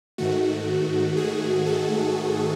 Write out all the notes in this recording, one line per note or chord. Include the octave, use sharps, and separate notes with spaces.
G#2 D#3 A3 F#4
G#4
A4